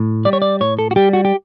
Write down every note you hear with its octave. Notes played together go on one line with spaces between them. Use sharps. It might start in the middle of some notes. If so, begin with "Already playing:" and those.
Already playing: A2
G3 D5
C#5
D5
A2 C#5
A4
F#4
G3 G4
F#4
G4